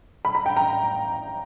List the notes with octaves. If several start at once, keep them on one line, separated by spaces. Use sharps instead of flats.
B5
A#5
G5
A#5